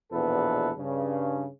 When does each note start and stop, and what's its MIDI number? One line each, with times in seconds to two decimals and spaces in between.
0.11 0.71 34
0.11 0.71 40
0.11 0.71 47
0.11 0.71 69
0.11 0.71 71
0.78 1.46 43
0.78 1.46 49